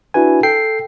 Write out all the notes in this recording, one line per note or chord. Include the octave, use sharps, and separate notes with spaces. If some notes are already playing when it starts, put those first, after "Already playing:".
D4 E4 F#4 B4 G#5
A4 G5 C7